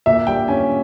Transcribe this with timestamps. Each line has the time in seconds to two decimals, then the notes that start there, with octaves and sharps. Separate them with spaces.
0.06 A#2 E5
0.27 G3 G5
0.48 C#4 G#5